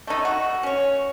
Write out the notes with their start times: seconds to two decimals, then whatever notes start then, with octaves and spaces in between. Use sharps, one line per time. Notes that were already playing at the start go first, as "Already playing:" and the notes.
0.07 A3 D#4
0.25 F#4
0.63 C#4 C#5